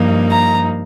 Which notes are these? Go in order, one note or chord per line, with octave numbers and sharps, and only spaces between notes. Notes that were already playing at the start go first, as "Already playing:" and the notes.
Already playing: G2 F3 A#3 D#4
A#5